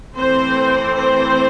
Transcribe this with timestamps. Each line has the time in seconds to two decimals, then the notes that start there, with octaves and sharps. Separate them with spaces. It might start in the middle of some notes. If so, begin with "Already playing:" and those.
0.15 E3 A3 C4 C5
0.94 C5